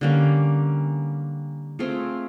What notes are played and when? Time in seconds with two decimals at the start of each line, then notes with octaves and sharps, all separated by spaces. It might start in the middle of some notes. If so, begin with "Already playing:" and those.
0.01 D3 G3 A#3 C#4
1.79 A3 C4 F4 G#4